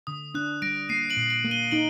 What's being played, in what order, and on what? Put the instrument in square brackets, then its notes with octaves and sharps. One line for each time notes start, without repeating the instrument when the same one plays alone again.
[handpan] D3 [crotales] D#6
[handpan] D4 [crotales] F#6
[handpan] G3 [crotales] A#6 D7
[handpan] A#3 [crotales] C7 D#7
[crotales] D7 F#7
[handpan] A#2
[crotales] D7 F#7
[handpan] A#3
[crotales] D#7 G7
[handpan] D#4 [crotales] D7 F#7